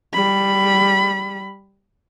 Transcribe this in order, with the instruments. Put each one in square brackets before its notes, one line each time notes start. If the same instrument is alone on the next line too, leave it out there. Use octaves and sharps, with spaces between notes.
[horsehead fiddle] G3 B5